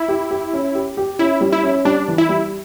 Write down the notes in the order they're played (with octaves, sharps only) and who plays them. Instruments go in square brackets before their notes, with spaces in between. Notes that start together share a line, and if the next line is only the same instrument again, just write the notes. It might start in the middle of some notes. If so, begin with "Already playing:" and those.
Already playing: [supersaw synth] E4
[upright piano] G4
G4
C#4
G4
G4
[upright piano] C#4 [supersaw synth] E4
[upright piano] G3
[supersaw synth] E4
[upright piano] C#4
[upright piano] G3 [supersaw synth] D4
[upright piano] E3
[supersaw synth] E4
[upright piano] G3